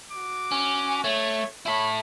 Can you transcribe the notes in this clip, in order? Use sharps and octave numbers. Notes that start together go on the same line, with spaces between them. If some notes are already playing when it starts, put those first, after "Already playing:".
F#4 D6
C#4
A3 C#5
E4 A4 C#5 B5